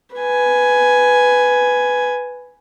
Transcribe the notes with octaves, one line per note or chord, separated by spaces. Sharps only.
B4 G#5